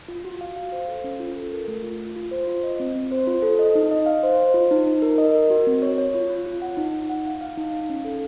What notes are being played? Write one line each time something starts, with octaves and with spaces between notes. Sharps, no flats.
F4
F#4
F5
F5
C5
A4
C#4
F4
A4
A#4
A3
F4
F4
F4
C5
F4
D#5
C4
C4
C5
F4
A4
D#5
D#4
D#5
F5
C5
C5
F4
D#4
D#4
A#4
D#5
A#4
F#4
C4
C#5
C#5
F4
F4
F4
F#5
D#4
D#4
F#5
F5
F5
D#4
F5
C#4
A4